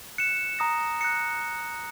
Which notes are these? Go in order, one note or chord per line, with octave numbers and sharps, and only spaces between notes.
F#6 C#7 E7
A#5 D#6 A#6
F#6 A#6 C#7